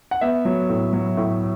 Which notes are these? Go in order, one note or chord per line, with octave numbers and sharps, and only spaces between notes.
F#5
B3 E5
F#3
A2
F#3
A2